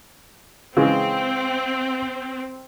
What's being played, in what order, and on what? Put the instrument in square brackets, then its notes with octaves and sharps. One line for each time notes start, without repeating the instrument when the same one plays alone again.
[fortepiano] C#3 E3 G#3 [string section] C4